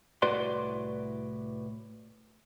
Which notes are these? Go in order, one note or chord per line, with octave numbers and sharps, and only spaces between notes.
C2 A2 F#4 B4 D5 C6